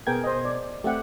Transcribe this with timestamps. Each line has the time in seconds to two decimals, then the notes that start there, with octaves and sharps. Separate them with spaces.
0.07 B2 B3 G#4 A#4 G5 G#6
0.24 C5 D#5
0.45 D5
0.84 A3 C4 G4 E5 F#5